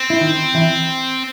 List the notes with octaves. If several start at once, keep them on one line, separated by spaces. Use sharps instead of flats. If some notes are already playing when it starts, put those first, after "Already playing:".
Already playing: C4
E4
D#3 D#4
E3 E4